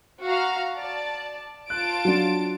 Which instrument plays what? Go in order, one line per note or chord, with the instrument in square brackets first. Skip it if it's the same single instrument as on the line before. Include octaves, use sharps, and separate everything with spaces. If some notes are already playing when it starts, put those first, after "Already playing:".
[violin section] F#4 F5 A#5
D5 A5
[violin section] F4 A5 D7 [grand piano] F#6
[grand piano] F#3 D4